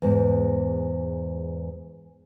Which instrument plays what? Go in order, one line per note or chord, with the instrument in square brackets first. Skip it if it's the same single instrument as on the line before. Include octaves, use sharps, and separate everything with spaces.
[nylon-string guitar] E2 G#2